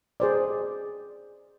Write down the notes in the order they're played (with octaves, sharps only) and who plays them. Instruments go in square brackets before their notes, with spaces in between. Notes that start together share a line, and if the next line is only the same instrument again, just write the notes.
[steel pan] G#4 C5 D5